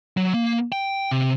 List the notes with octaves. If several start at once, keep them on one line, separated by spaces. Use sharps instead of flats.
F#3
A#3
G5
C3